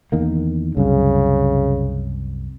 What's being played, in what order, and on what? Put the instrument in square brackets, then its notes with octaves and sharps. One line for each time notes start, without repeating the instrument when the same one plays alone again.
[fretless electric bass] E2 D#3 A#3
[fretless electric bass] C2 F#2 [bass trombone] C#3